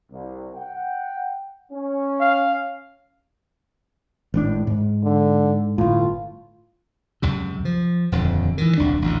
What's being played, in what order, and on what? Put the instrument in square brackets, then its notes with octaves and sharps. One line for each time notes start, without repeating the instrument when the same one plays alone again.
[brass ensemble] C2
F#5 G5
C#4
[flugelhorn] F5
[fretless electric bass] G#1 A2 D4
G#2
[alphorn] D3
[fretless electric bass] G1 A2 [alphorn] F4
[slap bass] C#2 F#2 C3
F3
D#1 F2 D3
D#3 E3
D#1 C2 F#2 D4
A1 D2